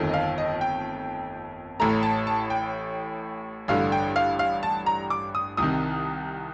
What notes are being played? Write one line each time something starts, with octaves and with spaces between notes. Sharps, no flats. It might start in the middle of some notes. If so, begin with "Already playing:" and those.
Already playing: G1 F2 D#3 A3
D#5
F5
D#5
G5
A1 A2 A3 A#5
A5
A5
G5
A1 G2 D3 F5
G5
F5
F5
A5
A#5
D6
D#6
C2 C3 D#3 D#6